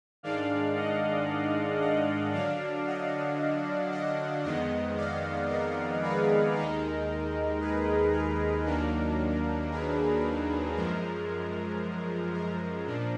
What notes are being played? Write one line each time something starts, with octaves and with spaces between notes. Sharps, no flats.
G#2 D#3 G#3 D4 D5 F5
D#5 F#5
D#5 F#5
D3 F#3 D4 D5 F5
D#5 F#5
D#5 F#5
F2 D#3 G#3 B3 D#5 F#5
D5 F5
A#4 D5
G#4 B4
D#2 D#3 G#3 D#4 A#4
G#4 B4
A#4
D#2 D#3 F#3 A#3 D4 A#4
G#4 B4
F#2 F3 G#3 A#4
A#4
A#2 F3 D4